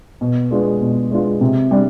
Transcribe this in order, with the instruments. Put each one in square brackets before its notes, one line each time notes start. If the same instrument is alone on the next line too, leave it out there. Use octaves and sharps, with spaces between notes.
[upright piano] B2
G#3 B3 D4 F4
B2
G#3 B3 D4 F4
C3
G3 D4